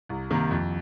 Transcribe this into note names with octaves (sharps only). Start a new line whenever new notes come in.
C2
C3 D#3 G3 A#3
F2